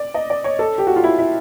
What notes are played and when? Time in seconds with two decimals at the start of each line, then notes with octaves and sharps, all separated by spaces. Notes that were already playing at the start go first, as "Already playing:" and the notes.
Already playing: D5
0.14 D#5
0.30 D5
0.44 C#5
0.59 A4
0.78 G4
0.87 F#4
0.96 F4
1.04 E4
1.19 E4